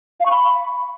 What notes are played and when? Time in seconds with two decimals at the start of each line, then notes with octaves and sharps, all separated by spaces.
0.20 F5
0.26 C#6
0.31 B5